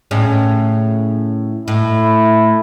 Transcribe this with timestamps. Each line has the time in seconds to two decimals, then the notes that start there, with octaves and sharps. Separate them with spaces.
0.11 A2 C#3 C#4
1.68 A2 E4